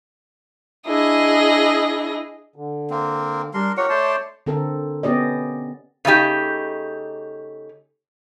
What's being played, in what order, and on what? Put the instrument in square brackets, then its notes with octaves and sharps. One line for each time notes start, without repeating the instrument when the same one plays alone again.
[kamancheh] D4 E4 [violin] G#4 D#5
[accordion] D3
[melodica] A#3 C4
[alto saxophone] G3 [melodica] D4 A#4 C6
[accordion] F4 [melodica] G4 A#4 F#5 [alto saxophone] C#5
[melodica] A3 A5 C6 [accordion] D5 D6 G6
[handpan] D3 C4 A4 A#4
B3 C#4 G4 D5 D#5
[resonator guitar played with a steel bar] C#3 A3 D#4 G4